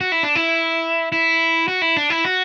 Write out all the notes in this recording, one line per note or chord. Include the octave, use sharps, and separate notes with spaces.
F#4
E4
D4
E4
E4
F#4
E4
D4
E4
F#4